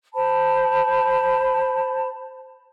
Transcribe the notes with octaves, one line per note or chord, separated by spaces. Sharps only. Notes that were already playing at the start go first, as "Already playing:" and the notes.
C5 A5 B5